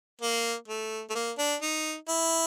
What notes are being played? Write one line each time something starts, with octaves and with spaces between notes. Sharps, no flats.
A#3
A3
A3
A#3
D4
D#4
E4